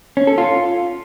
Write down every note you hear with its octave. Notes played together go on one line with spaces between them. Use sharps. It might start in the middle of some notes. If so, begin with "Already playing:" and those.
C#4
A4
F4